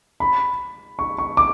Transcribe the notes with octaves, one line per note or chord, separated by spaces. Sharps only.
B5
C#6
C#6
D6